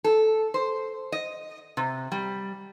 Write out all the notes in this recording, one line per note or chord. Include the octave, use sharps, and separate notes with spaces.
A4
C5
D#5
C3
G3